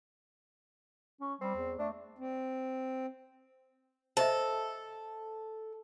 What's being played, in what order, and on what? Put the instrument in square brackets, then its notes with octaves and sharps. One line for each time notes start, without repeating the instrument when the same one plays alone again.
[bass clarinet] C#4
[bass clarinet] G3 [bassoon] C4
[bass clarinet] E2
[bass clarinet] A3 [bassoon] D4
[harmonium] C4
[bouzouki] A4 [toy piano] C5 D#5 E5